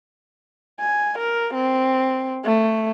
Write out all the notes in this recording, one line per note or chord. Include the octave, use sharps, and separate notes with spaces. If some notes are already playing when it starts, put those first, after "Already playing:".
G#5
A#4
C4
A3